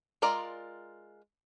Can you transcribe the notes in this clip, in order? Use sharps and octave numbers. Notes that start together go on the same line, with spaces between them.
G#3 F4 A#4 D5 A#5